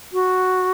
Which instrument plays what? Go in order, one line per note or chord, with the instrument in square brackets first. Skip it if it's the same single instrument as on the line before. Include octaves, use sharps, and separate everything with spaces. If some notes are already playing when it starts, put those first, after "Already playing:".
[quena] F#4